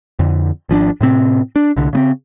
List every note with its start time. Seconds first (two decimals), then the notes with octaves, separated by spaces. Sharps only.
0.19 F2 D3
0.69 G#1 F3 C#4 D4
1.01 A2 C3 C4
1.56 D4
1.77 C2 D3
1.93 C#3 B3 C4